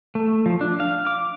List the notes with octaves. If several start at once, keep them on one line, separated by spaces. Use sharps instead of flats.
A3
F3
D4
F5
D6